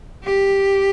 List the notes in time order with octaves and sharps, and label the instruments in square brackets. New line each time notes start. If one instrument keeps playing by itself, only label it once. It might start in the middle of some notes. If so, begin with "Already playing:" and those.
[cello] G4